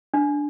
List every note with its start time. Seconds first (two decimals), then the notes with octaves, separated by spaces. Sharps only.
0.14 D4